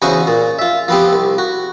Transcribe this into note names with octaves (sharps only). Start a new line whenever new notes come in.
E2 C#3 F#4 C5 C#6 D#6
A#2
F4 E5
F3 B3 C4 G4
C2
F#4